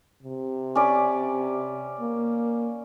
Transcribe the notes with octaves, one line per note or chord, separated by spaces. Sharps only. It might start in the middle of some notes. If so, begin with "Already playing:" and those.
C3
C#4 D5 B5
A#3